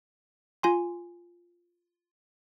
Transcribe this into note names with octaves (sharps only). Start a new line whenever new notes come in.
F4 G#5 C6